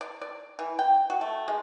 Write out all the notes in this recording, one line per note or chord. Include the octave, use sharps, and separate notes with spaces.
D5
D5
E3
G5
F#4
A3
G#3